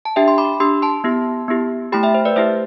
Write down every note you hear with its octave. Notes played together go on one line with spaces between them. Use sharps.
A5
D4 G4 E5 G5
C6
B5 D6
D4 G4 C6 E6
A5 C6
B3 E4 G4
B3 E4 G4
A3 E4 G4 G5 B5
E5 G5
C5
B4 D5
A3 E4 G4 C5 E5